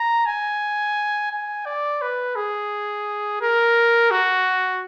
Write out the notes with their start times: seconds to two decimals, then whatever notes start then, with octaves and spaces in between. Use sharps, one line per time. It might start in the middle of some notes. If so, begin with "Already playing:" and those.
Already playing: A#5
0.26 G#5
1.31 G#5
1.66 D5
2.02 B4
2.36 G#4
3.41 A#4
4.11 F#4